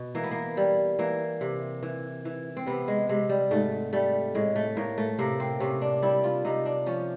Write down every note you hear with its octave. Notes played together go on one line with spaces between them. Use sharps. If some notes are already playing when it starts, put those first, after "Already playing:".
Already playing: B2
E3 A#3
B3
A#3
G3
E3 A#3
C3
E3
E3
C4
C3 B3
G#3
C3 G#3
G3
G#2 A3
G3 A3
A2 G#3
A3
A2 A#3
A3
C3 A#3
C4
C3 C#4
D4
G3 E4
F4
C3 D#4
D4
F3 C#4